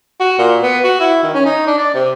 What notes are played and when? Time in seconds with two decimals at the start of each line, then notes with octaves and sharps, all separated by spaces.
0.20 F#4
0.39 A#2
0.62 B3
0.84 F#4
1.00 E4
1.23 D#3
1.34 C#4
1.45 D#4
1.67 D4
1.78 D5
1.94 C3